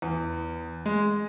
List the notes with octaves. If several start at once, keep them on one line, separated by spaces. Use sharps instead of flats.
E2
G#3